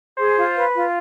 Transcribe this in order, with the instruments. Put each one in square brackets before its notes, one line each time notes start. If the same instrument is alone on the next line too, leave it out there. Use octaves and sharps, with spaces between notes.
[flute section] G#4 [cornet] C5
[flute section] F4
B4
F4